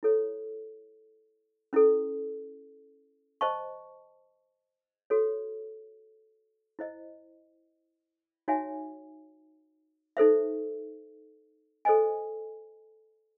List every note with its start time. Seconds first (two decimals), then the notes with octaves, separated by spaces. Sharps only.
0.03 E4 A4 C#5
1.73 C#4 E4 A4
3.41 C5 D#5 A5 C#6
5.10 F#4 A4 C#5
6.79 E4 C5 D#5
8.48 D#4 F#4 C#5 E5 G#5
10.17 D#4 A4 C5 E5
11.85 A4 C5 D#5 G#5